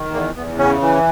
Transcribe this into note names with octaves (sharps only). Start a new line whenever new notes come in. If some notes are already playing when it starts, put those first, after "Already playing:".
Already playing: D#3
E2 A#3
E2 B3
C#3 C#4
E3